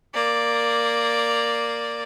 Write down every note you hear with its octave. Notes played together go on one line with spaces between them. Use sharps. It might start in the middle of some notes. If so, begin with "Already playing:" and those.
A#3 D5